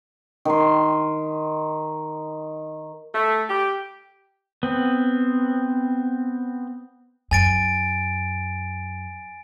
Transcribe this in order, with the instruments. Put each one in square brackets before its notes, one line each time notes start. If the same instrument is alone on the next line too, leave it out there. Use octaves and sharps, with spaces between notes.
[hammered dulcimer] D#3 C6
[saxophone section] A3
G4
[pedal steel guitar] B3 C4
[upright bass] F#2 [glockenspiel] G#5 A6 D7